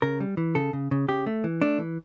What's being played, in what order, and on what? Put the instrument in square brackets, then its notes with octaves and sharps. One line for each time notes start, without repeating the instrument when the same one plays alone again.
[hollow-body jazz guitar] C#3 A#4
G3
E3
C#3 A4
C#3
C#3
C#3 G4
A3
E3
A3 D4
E3